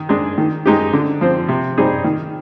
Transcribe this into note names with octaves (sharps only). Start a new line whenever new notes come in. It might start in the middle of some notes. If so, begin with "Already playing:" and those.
Already playing: D#3
G#3 D4 G#4
D#3
G#3 D#4 G4
D3
F3 C4
C3
G3 C4 D#4 G#4
D#3